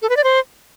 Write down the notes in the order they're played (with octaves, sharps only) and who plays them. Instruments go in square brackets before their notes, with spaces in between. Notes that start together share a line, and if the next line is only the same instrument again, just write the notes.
[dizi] A4
B4
D5
C5